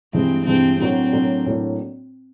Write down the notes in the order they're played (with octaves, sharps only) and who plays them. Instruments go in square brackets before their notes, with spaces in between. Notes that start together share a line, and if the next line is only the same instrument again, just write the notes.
[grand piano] G2 E3 G#3 [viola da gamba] C4
[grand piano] G2 E3 G#3 [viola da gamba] C4
[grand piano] A2 F#3 A#3 D4 F#4 [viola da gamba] C4
[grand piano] A2 F#3 A#3 D4 F#4
A2 F#3 A#3 D4 F#4